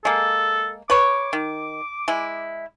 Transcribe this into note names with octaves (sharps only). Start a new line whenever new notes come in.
G#3 A#3 A4
B4 C#5 D6
D#3
G#3 E4